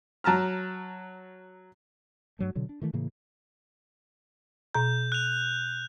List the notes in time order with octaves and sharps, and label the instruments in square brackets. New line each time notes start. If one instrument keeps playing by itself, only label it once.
[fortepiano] F#3 A5 A#5 F6
[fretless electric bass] G2 F#3 A3
B2 D3 F#3
D4
D#3 E3 A3
A2 C#3 E3 A#3
[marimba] B2 A#5 [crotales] G6
[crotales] F#6 F7